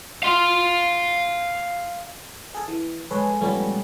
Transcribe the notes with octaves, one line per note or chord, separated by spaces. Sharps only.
F5 C6
G#4 A4
E3
G#3 A4 B4 C#5
A#2 G3 A3 B3 C#4